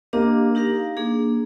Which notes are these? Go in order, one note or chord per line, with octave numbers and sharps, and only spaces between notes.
A#3 D4 G4 A#4 D#5
D#4 G4 A#4 F5
A#3 D4 G#4